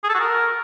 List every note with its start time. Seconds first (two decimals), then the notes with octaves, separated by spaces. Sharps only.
0.04 G#4
0.09 A4
0.15 F#4
0.20 A#4